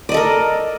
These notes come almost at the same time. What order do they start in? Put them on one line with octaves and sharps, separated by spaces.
D5 D#5 A4 A#4